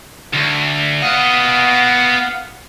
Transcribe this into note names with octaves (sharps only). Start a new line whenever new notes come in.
D2
B3 D#5 F5 F#5